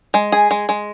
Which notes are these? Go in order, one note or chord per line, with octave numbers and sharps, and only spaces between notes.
G#3
G#4
G#3
G#3